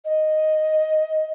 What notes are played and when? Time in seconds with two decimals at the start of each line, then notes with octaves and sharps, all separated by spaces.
0.04 D#5